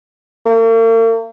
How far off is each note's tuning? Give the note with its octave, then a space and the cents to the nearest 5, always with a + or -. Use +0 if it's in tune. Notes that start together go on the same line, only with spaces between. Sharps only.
A#3 -45